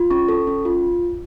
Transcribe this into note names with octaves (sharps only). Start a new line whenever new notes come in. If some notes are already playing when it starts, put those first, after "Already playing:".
Already playing: F4
C#4 C#6
A4
C#4
F4